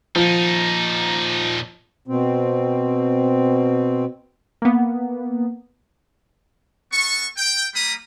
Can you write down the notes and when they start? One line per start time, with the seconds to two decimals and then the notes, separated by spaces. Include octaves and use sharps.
0.16 A#2 F3 D#4
2.07 B2 C4
4.62 A#3 B3
6.92 B3 A4 C#6
7.37 G5
7.74 G3 A#3 A#5 B5 D#6